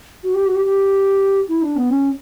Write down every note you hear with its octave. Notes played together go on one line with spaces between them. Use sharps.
F#4
G4
F#4
G4
G4
E4
D4
B3
C#4